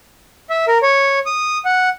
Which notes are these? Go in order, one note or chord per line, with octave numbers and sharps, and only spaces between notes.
E5
A#4
C#5
D#6
F#5